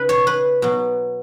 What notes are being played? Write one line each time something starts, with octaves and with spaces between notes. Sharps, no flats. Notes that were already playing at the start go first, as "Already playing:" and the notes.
Already playing: C#3 B4
C#5
B4
B2 F#3